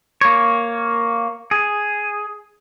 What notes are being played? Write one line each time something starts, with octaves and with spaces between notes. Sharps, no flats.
A#3 C#5
G#4